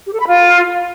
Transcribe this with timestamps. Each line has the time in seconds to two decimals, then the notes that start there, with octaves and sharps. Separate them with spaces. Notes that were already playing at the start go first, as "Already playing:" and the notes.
0.06 G4
0.13 A4
0.20 B5
0.27 F4